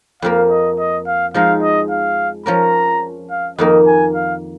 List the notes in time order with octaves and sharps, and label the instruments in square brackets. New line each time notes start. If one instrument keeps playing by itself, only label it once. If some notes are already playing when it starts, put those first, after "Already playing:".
[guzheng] F2 F3 A#3 [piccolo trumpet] F5
[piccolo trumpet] D#5
D#5
F5
[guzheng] F3 G#3 D#4 [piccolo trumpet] F5
[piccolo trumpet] D#5
F5
[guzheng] F3 C#4 A#4 [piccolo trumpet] A#5
[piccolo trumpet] F5
[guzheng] F2 D#3 A#3 [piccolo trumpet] D#5
[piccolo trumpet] G#5
F5